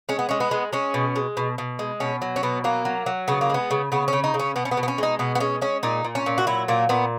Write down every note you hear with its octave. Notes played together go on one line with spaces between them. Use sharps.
G#3 C#4
B3
G#3 C#4
B3
G#3
G#3 C#4
B2
G#3
B2
B2
G#3
B2 C#4
F#3
C#4
B2 B3
F#3 A#3
F#3
F#3
C#3 B3
A#3
G#3 B3
C#3
C#3 B3
C#3 C#4
D#4
C#3
C#4
B2 B3
C#4
B3
B2
B3
C#4
G#3 D#4
B2 B3
B3
G#3 C#4
G#3 C#4
A#2 D#4
A#2
C#4
A#2
F#4
F#3 E4
A#2 A#3
A#2 B3